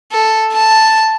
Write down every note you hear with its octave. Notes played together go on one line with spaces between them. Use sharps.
A4
A5